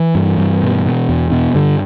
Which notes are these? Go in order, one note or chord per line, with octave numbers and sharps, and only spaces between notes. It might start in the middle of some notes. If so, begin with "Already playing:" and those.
Already playing: E3
G2
G2
B2
B2
E2
B2
G2 D3